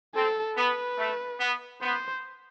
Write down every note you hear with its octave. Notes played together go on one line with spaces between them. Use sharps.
C4 A4
B3 B4
A3
B3
B3 C5